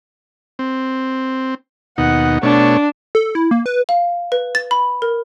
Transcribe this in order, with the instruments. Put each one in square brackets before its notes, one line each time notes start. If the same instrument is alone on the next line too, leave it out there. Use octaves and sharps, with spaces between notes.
[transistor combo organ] C4
[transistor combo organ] D#2 B2 D#4 [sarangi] F#5
[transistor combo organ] B2 A3 C#5 [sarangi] D4
[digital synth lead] A4
E4
A#3
B4
[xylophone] F5
B4
A6
B5
A#4